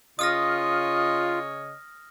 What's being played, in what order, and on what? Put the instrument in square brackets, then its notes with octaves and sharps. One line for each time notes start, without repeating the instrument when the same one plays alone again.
[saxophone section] C#3 C#5 D#5 [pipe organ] F4 [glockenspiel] D#6 F6 A#6